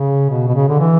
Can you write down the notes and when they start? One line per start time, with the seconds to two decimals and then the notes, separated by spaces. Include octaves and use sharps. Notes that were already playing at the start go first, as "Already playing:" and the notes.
Already playing: C#3
0.29 B2
0.48 B2
0.55 C#3
0.68 D3
0.79 E3